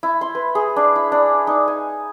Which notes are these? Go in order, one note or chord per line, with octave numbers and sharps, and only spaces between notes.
E4
C6
B4
G#4
D4
E4
D4
D#4
G#5